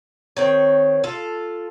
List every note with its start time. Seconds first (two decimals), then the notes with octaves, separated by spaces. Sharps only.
0.37 D#3 C4 C#5
1.04 F4 A4